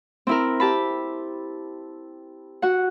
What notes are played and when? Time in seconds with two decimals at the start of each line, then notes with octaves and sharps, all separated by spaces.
0.27 C4 E4 A#4
0.60 G4 A5 B5
2.62 F#4 F#5